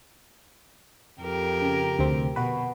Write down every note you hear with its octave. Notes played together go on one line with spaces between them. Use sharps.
F2 G4 A#4
C#3 A#5
D2 C3 C4
B2 F#4 B4